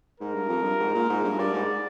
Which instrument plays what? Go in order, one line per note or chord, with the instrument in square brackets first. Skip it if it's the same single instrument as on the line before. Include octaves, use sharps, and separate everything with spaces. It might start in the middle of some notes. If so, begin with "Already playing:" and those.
[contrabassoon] G#2 [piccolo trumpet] A#4
[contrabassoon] G2
F2
G2
G#2
A#2
G#2
G2
[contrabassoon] G2 [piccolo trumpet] D5
[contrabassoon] G#2